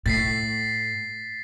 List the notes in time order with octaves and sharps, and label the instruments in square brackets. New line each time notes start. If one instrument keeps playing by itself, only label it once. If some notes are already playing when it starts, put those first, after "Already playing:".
[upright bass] A2 [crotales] A6 B6 C7